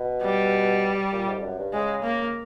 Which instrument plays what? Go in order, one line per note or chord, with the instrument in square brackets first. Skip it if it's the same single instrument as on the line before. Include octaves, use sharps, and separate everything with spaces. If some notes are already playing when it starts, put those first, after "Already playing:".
Already playing: [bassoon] B2
[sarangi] G3
[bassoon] A#2
G#2
F2
F#2
G2
[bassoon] C#3 [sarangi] G#3
[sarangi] A#3